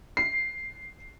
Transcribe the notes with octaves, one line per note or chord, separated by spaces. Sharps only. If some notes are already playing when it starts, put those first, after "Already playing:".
C7